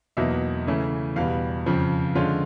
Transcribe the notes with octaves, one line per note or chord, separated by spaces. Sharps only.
E2 B2 F#3 A#3 D#4 E5
C#3 E3 A3 C#4 E4
E2 B2 G3 F5
F2 C#3 F3
D3 F3 G#3 C#4 F4